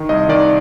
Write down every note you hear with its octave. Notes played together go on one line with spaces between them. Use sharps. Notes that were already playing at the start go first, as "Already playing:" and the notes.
Already playing: D#3
C2 D#5
D#3 D5